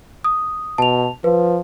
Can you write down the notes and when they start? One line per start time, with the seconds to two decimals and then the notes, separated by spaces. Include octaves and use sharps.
0.24 D#6
0.78 B2 A5 F7
1.24 F3 B4